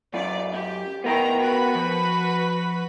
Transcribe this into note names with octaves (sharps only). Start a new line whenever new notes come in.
F#2 F4 D5
G4
B3 E4 A#4 G5 A#5
F#4 B4 B5
F3